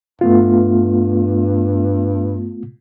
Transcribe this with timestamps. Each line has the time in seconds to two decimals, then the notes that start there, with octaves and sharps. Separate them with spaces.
0.21 G2 A3 B3 F4